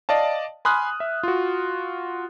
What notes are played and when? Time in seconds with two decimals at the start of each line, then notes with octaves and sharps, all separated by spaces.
0.09 D5 D#5 F5 A5
0.65 G#5 B5 C6 D#6 F6 F#6
1.00 E5
1.23 F4 F#4